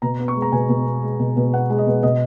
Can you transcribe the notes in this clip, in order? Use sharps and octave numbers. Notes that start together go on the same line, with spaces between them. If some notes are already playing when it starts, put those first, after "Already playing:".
B2 A#5
B3
C#6
G#3
A#5
B2 G#5
B2
B3
G#3
B2
B2
B3 F#5
G#3
D#5
B2
B2 D#5